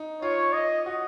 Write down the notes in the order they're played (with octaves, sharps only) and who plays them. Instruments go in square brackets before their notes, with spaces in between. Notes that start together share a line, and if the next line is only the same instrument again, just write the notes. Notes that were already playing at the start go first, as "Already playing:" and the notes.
Already playing: [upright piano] D#4
[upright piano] F4 [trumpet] C#5
[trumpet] D#5
[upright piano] F#4